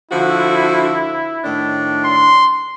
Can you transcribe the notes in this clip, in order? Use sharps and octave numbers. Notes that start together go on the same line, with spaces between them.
D3 F3 E4 F#4
A2 D#3 D4
C6